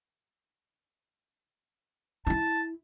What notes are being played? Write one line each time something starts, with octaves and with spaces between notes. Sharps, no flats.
D#4 E4 A5